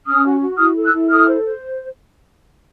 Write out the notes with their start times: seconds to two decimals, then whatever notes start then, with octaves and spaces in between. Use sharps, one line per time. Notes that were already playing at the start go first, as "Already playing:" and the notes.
0.07 C#4 D#6 F6
0.24 F#4
0.41 F#4
0.58 E4 D#6 F6
0.76 A4
0.84 E6 F#6
0.93 E4
1.10 A4 D#6 F6
1.27 C5
1.44 C5